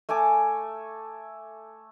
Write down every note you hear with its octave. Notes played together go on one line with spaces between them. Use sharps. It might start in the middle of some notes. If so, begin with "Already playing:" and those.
A3 A4 G#5 D6